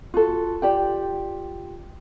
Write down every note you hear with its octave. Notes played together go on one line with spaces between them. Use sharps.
F4 F#4 A4
F4 G4 D5 G5